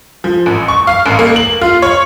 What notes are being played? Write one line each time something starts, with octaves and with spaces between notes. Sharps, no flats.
F3
A1
C#6
F5
A1
A#3
F#7
F4
C#5